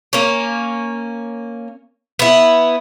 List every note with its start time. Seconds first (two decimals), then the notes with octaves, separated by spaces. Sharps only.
0.13 A#3 C#4
2.19 B3 E4